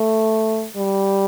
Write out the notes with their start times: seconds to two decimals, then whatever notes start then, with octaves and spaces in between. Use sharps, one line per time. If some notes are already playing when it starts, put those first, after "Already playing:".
Already playing: A3
0.76 G3